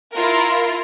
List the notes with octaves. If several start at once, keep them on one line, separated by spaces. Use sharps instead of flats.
E4 F4 A#4